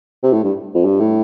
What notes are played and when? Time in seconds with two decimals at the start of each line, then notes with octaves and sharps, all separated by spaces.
0.23 C3
0.33 A2
0.44 G2
0.74 F2
0.85 G2
1.00 A2